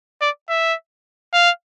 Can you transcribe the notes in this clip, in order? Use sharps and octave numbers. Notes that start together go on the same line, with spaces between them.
D5
E5
F5